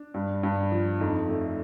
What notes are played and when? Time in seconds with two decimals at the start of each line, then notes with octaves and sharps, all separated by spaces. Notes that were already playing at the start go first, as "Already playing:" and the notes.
Already playing: D4
0.14 G2
0.43 G2
0.72 F3
1.00 F2 D#4
1.29 A3